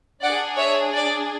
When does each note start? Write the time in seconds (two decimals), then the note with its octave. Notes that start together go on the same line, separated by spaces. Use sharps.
0.22 D4 G#4 D5 F#5
0.57 C#5 E5
0.94 D5